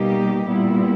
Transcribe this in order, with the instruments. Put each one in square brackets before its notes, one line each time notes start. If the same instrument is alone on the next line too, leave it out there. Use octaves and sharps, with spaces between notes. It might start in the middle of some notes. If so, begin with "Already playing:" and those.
Already playing: [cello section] B2 G3 A#3 D#4 G4
A#2 G3 B3 E4